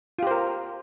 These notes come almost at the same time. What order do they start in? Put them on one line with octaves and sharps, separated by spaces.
F4 G4 C5 A#4